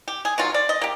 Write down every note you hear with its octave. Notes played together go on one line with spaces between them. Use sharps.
G4
G#4
D#3 F#3 F4
D5
D#5
A#3 G4